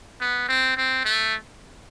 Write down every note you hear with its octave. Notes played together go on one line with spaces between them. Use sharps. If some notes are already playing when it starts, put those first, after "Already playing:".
B3
C4
C4
A3